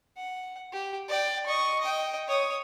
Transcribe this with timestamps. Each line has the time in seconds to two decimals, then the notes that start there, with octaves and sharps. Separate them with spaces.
0.17 F#5
0.73 G4
1.09 D5 G5
1.46 D#5 C#6
1.81 D#5 G5
2.28 C#5 D#6